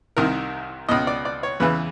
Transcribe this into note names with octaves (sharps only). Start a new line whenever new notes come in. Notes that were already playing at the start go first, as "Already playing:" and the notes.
C2 C3 D#3 A#4
C#2 B2 D#5
D5
D5
C#5
E2 C#3 E3 B4